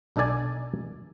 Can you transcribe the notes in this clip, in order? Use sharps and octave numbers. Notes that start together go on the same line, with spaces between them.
B1 D4 D#4 A4 D5 G#5